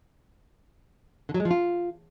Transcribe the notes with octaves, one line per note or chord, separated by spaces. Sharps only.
D3
F#3
G#3
F3
F4